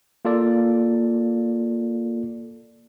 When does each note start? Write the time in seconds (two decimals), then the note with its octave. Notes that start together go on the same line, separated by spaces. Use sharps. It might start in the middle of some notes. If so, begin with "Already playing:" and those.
0.25 A#3 F4 A4 D5